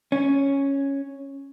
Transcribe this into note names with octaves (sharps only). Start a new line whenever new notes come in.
C#4